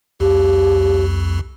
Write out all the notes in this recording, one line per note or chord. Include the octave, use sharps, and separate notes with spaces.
C2 F2 G4